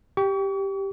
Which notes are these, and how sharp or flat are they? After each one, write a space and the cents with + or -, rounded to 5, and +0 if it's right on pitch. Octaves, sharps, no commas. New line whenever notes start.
G4 +0 C#6 +40